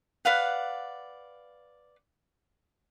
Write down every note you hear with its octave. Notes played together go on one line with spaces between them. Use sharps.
B4 D5 F5 F#5